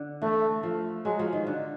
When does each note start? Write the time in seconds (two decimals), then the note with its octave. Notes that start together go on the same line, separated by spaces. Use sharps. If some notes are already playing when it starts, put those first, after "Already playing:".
Already playing: D3
0.22 E3 A3
0.63 F3
1.05 F#3 G#3
1.19 F3
1.33 D#3
1.47 D3